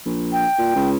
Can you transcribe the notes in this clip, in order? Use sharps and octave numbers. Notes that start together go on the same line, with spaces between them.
A#1
G5
A#2
C#2